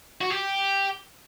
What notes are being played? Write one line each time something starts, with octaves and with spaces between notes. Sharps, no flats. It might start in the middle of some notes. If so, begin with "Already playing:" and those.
F#4
G4